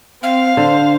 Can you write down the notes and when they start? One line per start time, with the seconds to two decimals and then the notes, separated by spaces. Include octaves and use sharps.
0.22 C4 F5
0.57 D3 C5